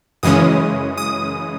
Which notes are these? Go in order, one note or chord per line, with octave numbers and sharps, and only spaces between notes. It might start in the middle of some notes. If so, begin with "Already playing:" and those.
F#2 C#3 E3 G#3 C#4 D#6
D#6